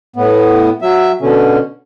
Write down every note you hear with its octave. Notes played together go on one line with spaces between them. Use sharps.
A2 B3
F#3 E5
B2 D3 C#4